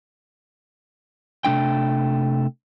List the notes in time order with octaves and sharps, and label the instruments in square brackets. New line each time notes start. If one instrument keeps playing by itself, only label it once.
[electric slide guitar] C3 A3 D4 G5